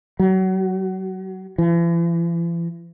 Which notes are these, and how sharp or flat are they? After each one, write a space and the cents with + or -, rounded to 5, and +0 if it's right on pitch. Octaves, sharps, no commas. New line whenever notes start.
F#3 +30
E3 +45